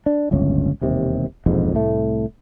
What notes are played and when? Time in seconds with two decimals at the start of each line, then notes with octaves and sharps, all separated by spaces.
0.06 D4
0.31 D1 G1 C#2 C#4
0.81 E1 D#2 C3
1.46 E1 A#1 F2 G#2
1.72 C2 A2 A3